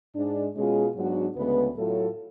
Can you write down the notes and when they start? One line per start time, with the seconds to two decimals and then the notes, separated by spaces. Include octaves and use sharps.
0.15 G#2 G#3 D4
0.55 B2 G#3 C#4 F4 G#4
0.95 G#2 F#3 B3 D4 F#4
1.36 D2 C#3 G#3 B3
1.76 A2 F#3 A3 F4 A4